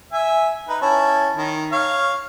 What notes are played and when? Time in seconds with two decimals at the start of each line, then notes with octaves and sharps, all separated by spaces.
0.13 E5 G#5
0.69 D#4 B4
0.82 C#4 E4 A5
1.37 D#3
1.72 C#5 F5